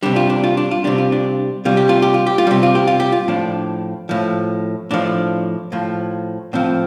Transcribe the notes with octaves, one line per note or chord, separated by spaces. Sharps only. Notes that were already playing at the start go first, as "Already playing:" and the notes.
C3 G3 D4
F4
D4
F4
D4
F4
C3 G3 D4
F4
D4
C3 G3 F4
G4
F4
G4
F4
G4
F4
C3 G3 G4
F4
G4
F4
G4
F4
A2 F3 D4
A2 F3
A2 F3 D4
A2 F3
A2 F3 C4